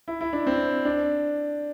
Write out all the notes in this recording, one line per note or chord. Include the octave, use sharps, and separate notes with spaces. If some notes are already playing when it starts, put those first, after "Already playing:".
E4
E4
D4
C4
D4